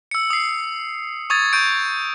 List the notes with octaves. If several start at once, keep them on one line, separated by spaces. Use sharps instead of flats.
E6 C#7
D#6 C7
C#6 D#6 G#6 A6
C#6 G6 D7